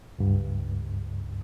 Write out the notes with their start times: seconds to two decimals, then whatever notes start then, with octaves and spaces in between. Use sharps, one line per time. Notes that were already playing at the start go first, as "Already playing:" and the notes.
0.19 C#2 G2